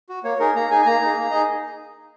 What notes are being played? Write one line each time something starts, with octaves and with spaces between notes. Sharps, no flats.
F#4
A#3 C#5
D#4 G#4 A#4
A#3 A#5
D#4 G#4 G#5
G#5
A#3 A#5
D#4 G#4
A#3
D#4 G#4 D#5